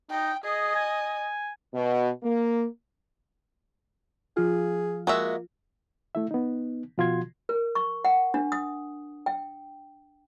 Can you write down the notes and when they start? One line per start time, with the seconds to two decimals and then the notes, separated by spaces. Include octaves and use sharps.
0.10 D#4 G5
0.44 G#4 D#5
0.75 G#5
1.73 B2
2.23 A#3
4.37 F3 F4 G#4
5.07 G#3 A#3 F#4 E5
6.15 A3 E4 E5
6.31 B3 D#4
6.98 B2 F3 F4 F#4 C6 G#6
7.49 A#4
7.75 C#6
8.05 F#5
8.34 D4
8.52 D#6
9.26 G5